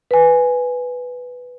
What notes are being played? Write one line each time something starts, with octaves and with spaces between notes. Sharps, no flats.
B4 G#5